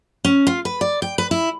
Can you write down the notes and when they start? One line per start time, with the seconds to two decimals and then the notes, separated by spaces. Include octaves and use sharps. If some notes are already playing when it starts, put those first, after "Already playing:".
0.25 C#4
0.47 F4
0.65 B4
0.81 D5
1.02 G5
1.18 B4
1.31 E4